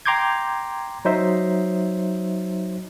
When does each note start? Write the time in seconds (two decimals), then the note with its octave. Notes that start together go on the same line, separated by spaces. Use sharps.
0.06 G5 A#5 C6 D6 G6 G#6
1.05 F#3 D#4 C5 E5